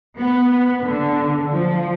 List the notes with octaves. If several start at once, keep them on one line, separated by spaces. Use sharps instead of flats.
B3
D3
F3